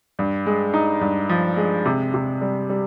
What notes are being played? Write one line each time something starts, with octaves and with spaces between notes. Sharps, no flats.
G2
G#3
D#4
G2
F3
G#3
C3
C3
G3
G3